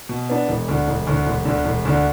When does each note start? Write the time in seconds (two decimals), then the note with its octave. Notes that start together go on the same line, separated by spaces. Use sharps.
0.09 B2
0.30 B3 D4
0.48 E1
0.68 D2 D3
0.88 E1
1.07 D2 D3
1.26 E1
1.45 D2 D3
1.65 E1
1.85 D2 D3